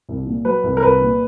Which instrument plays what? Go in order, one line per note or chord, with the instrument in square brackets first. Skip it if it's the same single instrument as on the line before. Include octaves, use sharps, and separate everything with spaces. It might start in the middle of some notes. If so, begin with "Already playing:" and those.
[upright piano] C2
A#2
F#3 B4
C2
A#4
C2 B4
A#2